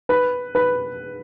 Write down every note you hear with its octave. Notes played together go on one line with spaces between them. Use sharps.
B4
B4